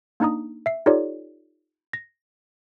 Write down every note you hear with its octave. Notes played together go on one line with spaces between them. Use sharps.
A#3 D4 D#4 A#5 D#6
E5 C7
D#4 F4 G4 A4 C#5 D5
A#6